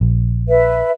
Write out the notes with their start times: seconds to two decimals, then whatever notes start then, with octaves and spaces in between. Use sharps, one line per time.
0.01 A#1
0.49 B4 E5